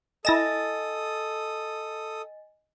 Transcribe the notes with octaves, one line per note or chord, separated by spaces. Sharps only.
E4 A4 D#5 G#5 D#6 A6 A#6 E7